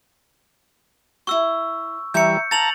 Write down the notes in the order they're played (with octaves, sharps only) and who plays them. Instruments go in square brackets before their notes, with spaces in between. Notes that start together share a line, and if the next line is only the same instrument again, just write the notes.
[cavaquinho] E4 F#4 [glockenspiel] C#6 E6
[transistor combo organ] E3 G3 [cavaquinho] E5 A#5 C#6 [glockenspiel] G6 C#7
[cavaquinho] F5 [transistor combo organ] A5 A#5 [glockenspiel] A6 F7 F#7